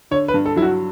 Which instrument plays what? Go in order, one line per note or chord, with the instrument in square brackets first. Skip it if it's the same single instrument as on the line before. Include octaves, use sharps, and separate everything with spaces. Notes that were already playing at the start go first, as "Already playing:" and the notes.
[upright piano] D3 [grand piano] C#5
[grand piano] B4
[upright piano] G2
[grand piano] A4
[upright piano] F#3 [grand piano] E4
[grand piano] F#4